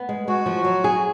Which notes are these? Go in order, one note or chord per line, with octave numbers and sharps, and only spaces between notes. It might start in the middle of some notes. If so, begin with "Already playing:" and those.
Already playing: B3
G#3
G#3 F#4
F3
F#3
G#4